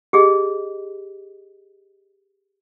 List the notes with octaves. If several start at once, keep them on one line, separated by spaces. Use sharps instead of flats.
G4 G#4 D#5